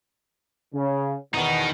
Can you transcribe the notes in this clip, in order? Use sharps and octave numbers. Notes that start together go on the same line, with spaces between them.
C#3
E2 B2 D#3 D#4